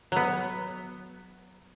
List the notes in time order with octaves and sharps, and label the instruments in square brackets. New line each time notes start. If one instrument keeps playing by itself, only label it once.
[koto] F#3 B3